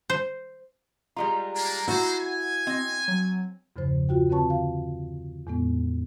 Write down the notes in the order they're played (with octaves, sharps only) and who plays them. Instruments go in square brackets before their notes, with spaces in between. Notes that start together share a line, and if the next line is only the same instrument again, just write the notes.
[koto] C5
[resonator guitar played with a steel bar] G3 G#3 F4 [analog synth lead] A#5
[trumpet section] A#3 D4
[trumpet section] G#3 C5 [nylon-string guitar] E4 F#4 [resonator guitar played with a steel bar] F#5
[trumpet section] G#5
[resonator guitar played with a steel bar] C4 [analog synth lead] D#5
[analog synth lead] F#3
[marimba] E2 G2 C#3 F3 C5
F4 F#4 G5
D3 C4 B4 C#5 A5 C#6
F5
E2 A2 G#3 B3